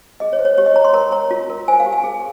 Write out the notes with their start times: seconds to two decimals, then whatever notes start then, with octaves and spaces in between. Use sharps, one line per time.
0.20 G#4 D#5
0.33 C#5
0.39 C5
0.45 C#5
0.58 G4 C#5
0.66 D#5
0.76 C#5 A#5
0.84 C6
0.94 A#4 A#5
1.12 C#5 A#5
1.31 F4
1.50 A#4
1.68 C5 G#5
1.80 F5
1.86 G4
1.93 G#5
2.04 G#4